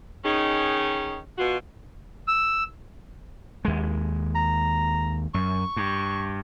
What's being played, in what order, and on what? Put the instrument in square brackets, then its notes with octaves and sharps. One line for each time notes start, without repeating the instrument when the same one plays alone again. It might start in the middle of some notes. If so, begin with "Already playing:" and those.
[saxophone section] D#3 C#4 D#4 G#4
B2 F4 F#4
[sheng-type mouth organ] E6
[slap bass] D#2 G#3
[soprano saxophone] A#5
[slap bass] F#2 [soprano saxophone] C#6
[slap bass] G2